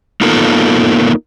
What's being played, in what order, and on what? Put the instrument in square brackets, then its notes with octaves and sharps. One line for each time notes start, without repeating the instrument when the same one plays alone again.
[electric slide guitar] A#3 B3 D#4 F4 A4 A#4